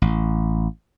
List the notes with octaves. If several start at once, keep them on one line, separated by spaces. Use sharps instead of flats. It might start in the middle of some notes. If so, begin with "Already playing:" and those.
A1